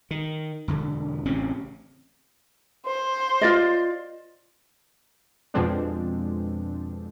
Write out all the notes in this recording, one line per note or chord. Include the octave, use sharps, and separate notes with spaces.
D#3
E1 D3
A1 C#3 C4 C#4
C5
F4 D5 D#5
F2 B2 F3 G#3 C4 D4